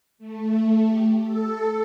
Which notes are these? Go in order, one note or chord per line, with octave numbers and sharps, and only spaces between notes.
A3
G4
A4